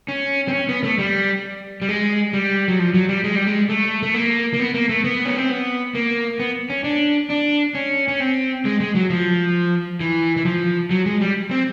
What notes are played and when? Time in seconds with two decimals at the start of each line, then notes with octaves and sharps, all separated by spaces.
0.08 C#4
0.48 C4
0.53 C#4
0.69 B3
0.83 A3
0.98 G3
1.82 G3
1.89 G#3
2.33 G3
2.68 F#3
2.79 F3
2.94 F#3
3.09 G3
3.24 G#3
3.36 G3
3.47 G#3
3.69 A3
4.03 A3
4.14 A#3
4.54 A#3
4.59 B3
4.74 A#3
4.89 A3
5.04 B3
5.25 C#4
5.37 C4
5.50 B3
5.95 A#3
6.40 B3
6.70 C#4
6.84 D4
7.30 D4
7.75 C#4
8.08 C#4
8.20 C4
8.65 G#3
8.80 G#3
8.95 F#3
9.10 F3
10.00 E3
10.37 E3
10.45 F3
10.91 F#3
11.06 G#3
11.21 G3
11.51 C4